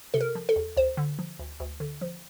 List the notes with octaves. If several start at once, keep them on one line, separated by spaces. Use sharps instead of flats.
C3 A4
A#4
F3
A4
E2
D2 C5
D3
F3
D2
D2
D3
F3